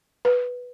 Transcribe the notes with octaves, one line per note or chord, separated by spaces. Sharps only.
B4